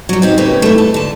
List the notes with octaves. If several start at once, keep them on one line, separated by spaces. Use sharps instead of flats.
F#3 G3
C4 D#4 G4
C#3 A#3 C4 C#4 G4 B4
A3 E4
A4
D3 A5